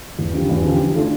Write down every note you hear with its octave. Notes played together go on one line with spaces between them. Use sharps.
E2
D3 F3 C#4 G4
E2
D3 F3 C#4 G4
F3
A3 D4 F4 A4